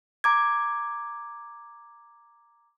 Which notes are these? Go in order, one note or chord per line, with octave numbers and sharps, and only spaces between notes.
A#5 D6 G#6